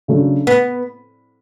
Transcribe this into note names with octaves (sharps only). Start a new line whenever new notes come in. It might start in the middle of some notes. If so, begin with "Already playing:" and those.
C#3 F#3 A3 D4
B3